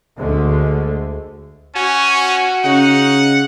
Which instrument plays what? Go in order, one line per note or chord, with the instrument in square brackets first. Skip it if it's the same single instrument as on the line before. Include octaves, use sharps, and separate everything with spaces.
[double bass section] D2 D3 G#3 A3
[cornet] C#4 [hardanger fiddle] F#4 [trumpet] G#5
[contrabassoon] C#3 [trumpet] D#4 [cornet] F#5